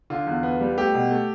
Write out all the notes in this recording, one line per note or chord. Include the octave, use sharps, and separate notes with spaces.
D3 F4
E2
B3
G3
A3 G4
B2
A3